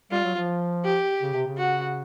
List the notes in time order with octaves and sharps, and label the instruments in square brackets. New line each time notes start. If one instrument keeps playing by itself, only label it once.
[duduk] G3 [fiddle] F4
[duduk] F#3
F3
[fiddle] G4
[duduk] C#3
C3
C#3
[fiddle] F#4